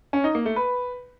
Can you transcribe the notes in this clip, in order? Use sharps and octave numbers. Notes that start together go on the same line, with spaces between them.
C#4
D#4
A#3
A3
B4